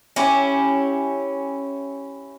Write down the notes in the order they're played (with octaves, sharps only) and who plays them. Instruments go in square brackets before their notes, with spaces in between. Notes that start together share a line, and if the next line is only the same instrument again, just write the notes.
[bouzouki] C#4 E4 G4